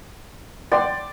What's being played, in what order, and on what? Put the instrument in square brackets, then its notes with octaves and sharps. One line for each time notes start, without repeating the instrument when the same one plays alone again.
[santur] D5 [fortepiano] F#5 G5 C6